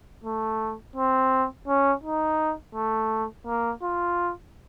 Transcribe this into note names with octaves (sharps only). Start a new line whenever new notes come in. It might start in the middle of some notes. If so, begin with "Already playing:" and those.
A3
C4
C#4
D#4
A3
A#3
F4